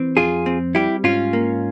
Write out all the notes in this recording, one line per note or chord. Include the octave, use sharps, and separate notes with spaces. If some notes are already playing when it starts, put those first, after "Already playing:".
Already playing: E3 C4
F2 F4 G#4
C4
G3 E4 G4
G#2 C#4 F4
A#3